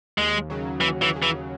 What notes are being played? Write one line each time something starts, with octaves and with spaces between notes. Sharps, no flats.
D#2 G#3
C#3 F#3
D#2 E3
E3
C#3 F#3
E3